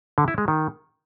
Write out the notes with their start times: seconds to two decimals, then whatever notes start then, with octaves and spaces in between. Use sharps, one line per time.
0.18 D3
0.28 E4
0.38 G#3
0.48 D#3